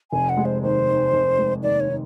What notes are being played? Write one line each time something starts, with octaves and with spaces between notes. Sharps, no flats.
F1 G#5
F#5
G#3
C5
D#2 C5
D#3
F1
G#3
D#2 D5
C#5
D#3